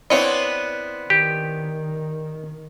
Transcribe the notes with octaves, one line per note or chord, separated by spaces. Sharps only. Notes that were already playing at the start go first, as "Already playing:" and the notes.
B3 C4 D4 E4 C#5 D#5
D#3 G4